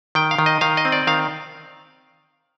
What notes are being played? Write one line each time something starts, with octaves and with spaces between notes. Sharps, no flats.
D#3 G5
F5
D#3
D#5
D#3 F5
D#5
C4
D5
D#3 F5